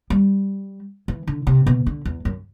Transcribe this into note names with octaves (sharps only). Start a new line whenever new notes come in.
G3
E3
D3
C3
B2
D3
E2
F#2